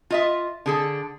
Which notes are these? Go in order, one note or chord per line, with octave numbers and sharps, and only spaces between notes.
F4 D#5 E5
D3 G#4 A4